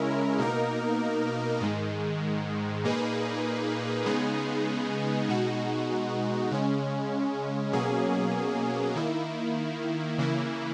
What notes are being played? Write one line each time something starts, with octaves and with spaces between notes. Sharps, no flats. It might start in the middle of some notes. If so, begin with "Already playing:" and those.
Already playing: C#3 G#3 C#4 E4 A#4
B2 A#3 D#4 A#4
G#2 D#3 G#3
A#2 A#3 D#4 G#4 B4
C#3 G#3 B3 D#4 G#4
B2 G#3 D#4 F#4
C#3 G#3 C#4
B2 F#3 A#3 C#4 G#4
D#3 A#3 E4
C#3 E3 A#3 E4